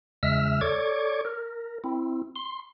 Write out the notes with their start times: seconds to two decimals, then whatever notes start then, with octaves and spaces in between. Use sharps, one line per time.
0.23 E2 C#3 G#3 E5 E6 F6
0.61 A4 C#5 D5 C#6 D6 G#6
1.25 A#4
1.84 C4 E4
2.36 C6